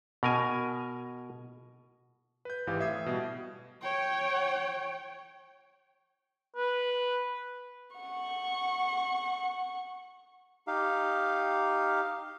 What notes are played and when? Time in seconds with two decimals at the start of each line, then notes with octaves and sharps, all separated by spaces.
0.23 B2 A#4 G#5
2.45 B4 G6
2.67 G#1 G#2 E3 G4 F5
2.80 A2 E5 D#6 G#6 C7
3.06 B2 G3 D#5
3.81 C#5 G5
6.56 B4
7.97 F#5 C#6
10.67 D#4 G4 F5